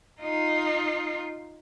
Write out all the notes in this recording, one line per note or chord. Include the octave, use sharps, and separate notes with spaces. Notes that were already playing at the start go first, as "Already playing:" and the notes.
D#4 F4